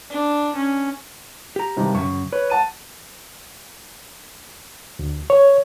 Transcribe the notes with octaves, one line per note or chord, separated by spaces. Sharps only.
D4
C#4
G4 A#5
G2 C3 D#3
F#2 C#3 C#6
B4 C#5
F#5 A5 D#7
D2
C#5